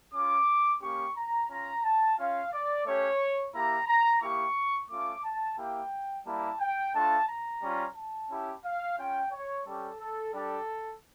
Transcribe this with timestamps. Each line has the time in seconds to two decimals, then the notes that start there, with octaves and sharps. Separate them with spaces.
0.13 C#4 F4 D6
0.82 A#3 C#4 G4 C#6
1.16 A#5
1.49 C#4 F4 A#5
1.83 A5
2.18 C#4 F4 F5
2.52 D5
2.85 A3 C#4 G4 C#5
3.54 A#3 E4 G4 A#5
3.87 A#5
4.21 A#3 E4 G4 C#6
4.90 A3 C#4 F4 D6
5.24 A5
5.58 A#3 E4 G4 G5
6.25 G3 A#3 E4 G4 A5
6.60 G5
6.94 A3 D4 F4 A5
7.27 A#5
7.62 G3 C#4 F4
7.96 A5
8.30 C#4 E4 G4
8.64 F5
8.98 C#4 F4 G5
9.32 C#5
9.66 G3 C#4 G4 A4
10.00 A4
10.33 G3 D4 G4 A4